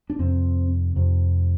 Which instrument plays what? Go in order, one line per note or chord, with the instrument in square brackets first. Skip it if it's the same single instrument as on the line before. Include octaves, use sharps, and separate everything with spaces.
[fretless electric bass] D4
F2 C3 C4
F2 C3